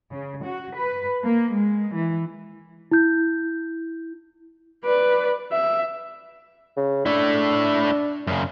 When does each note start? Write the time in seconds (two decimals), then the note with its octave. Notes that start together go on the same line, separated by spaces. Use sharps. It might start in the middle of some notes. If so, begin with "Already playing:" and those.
0.12 C#3
0.46 F#4
0.78 B4
1.26 A#3
1.55 G#3
1.96 E3
2.91 E4 G6
4.85 B4 D5
5.52 E5
6.77 C#3
7.06 A3 D4 E4
8.27 F#2 C#3